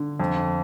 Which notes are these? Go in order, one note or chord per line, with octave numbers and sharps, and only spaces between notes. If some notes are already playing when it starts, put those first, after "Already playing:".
Already playing: D3
F2